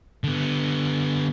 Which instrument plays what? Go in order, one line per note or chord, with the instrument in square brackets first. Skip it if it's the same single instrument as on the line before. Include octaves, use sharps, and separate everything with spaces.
[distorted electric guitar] D3 B3